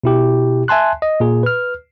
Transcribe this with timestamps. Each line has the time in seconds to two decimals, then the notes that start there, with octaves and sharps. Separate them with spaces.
0.04 B2 E4 G4
0.68 E5 G#5 A5 C6 F#6
1.02 D#5
1.20 A#2 G#4
1.43 B4 F6